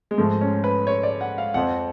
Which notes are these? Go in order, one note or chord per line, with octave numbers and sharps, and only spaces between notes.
G#3
G#2 F3 A3
C#4
B4
C#5
D5
F#5
F5
F2 F3 F#5